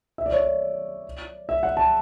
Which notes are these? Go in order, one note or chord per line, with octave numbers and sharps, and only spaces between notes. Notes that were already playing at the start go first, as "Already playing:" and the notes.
E5
D5
C#5
D5
E5
F#5
A5